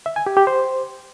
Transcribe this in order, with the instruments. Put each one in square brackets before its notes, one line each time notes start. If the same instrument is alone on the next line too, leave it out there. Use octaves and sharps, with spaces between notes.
[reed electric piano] E5
G#5
G4
G4
C5